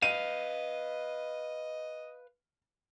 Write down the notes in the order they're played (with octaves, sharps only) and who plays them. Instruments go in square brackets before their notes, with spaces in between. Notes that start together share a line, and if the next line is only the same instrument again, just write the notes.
[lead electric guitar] B4 F5 [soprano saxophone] D#5 [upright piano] D#7